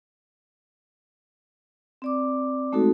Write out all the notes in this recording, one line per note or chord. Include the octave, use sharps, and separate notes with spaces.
C4 D5 D6
G#3 A3 C4 D#4 F#4 A4